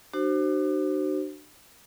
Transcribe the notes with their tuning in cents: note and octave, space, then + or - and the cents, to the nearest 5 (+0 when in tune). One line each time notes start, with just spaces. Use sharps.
D4 +35 F#4 +30 C5 +5